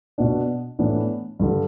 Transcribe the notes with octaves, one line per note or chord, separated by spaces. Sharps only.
B2 B3 D4
A2 E3 B3 D4
G2 D3 G3